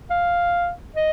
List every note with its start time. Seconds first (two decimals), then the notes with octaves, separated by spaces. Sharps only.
0.10 F5
0.96 D#5